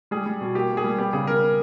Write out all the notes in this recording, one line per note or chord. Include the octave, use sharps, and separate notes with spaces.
G3 G#4
G3
B2
A#3 G4
A#3
G#4
G3
B3 G4
C#3 G#4
C#3 A#4